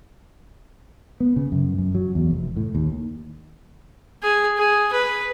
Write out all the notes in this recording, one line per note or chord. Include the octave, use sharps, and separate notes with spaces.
B3
C#3
F#2
F#2
F#3
E2
F1
A2
D#2
G#4
G#4
B4